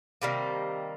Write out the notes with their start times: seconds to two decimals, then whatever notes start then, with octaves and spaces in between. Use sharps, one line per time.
0.22 C3 D#3 G3 A#3